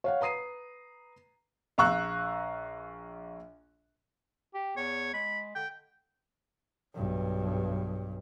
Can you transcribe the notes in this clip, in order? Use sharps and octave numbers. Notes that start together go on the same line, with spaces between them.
C#5 F5 F#5
B4 A#5 D#6 C7 D#7
A#1 F5 A#5 C#6 E6 F#6
G4
E2 C#5
G#3 B5
D3 G5
B1 G2